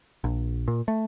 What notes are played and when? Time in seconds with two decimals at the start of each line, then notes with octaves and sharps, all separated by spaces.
0.24 A#1
0.68 A#2
0.88 A3